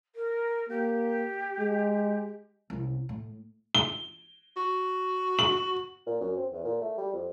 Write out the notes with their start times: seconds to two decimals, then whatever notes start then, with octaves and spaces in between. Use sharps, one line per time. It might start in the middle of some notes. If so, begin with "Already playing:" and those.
0.15 A#4
0.69 A#3 G4
1.59 G#3
2.70 C2 C#3
3.09 A2
3.75 G7
4.57 F#4
5.39 F#7
6.06 A#2
6.21 F#2
6.37 C4
6.52 E2
6.64 A#2
6.81 A3
6.98 G3
7.13 F2